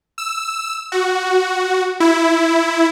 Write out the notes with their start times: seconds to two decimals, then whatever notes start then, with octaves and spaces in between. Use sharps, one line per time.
0.18 E6
0.92 F#4
2.00 E4